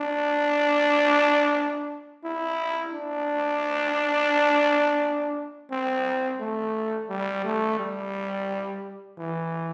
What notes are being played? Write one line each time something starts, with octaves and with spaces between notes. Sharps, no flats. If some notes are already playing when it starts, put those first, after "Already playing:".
Already playing: D4
E4
D4
C4
A3
G3
A3
G3
E3